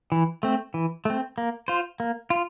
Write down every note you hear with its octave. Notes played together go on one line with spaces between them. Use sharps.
E3
A3 C4
E3
A3 C4
A#3
F4 C5
A#3
F4